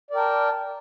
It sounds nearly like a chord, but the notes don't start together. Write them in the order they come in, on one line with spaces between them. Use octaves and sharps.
D5 A#4 G5 A5